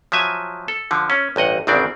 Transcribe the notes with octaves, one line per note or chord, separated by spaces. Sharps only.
F3 F#3 E5 G#5
A4
D3 F3
C#4
A1 G2 D#5 F#5
G#1 E2 C#3 C4 D4 D5